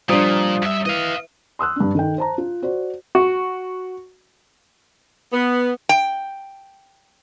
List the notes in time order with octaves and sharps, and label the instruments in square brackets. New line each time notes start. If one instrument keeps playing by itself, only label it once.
[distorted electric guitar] A#2 [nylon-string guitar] F3 D4 [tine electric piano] G3 D#6
[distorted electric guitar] F#2 E5
[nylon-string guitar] E3 [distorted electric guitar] D#5 F5
[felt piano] C6 D#6 E6 F#6
G2 D4
D#3 A4 G5
C5 A5 A#5
F4
F#4 C5 D5
[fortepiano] F#4
[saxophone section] B3
[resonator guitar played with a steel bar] G5